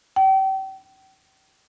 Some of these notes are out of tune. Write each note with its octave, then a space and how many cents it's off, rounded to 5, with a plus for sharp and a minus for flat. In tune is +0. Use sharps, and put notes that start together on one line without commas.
G5 -35